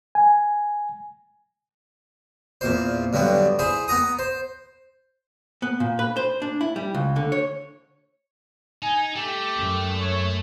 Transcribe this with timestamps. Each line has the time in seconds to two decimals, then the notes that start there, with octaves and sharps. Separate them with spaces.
0.15 G#5
2.61 E2 A#2 C5
3.13 G2 D3 F#3 G3 B3
3.59 E4 G#4 C5
3.88 B3 F#5 A#5 D#6
4.19 C5
5.62 B3
5.80 A#2
5.99 B4
6.17 C5
6.42 D4
6.61 E4
6.76 G3
6.94 C#2
7.16 D3
7.32 C#5
8.82 D#4 G#5
9.16 A3 G4
9.55 F#2
9.98 C#5